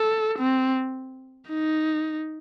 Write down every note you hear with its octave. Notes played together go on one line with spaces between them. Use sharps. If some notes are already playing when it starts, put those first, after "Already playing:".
Already playing: A4
C4
D#4